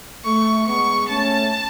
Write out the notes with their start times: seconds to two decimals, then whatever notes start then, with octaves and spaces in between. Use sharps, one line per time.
0.25 A3 C#6
0.67 G#3 B3 C#6
1.09 A3 C#4 A5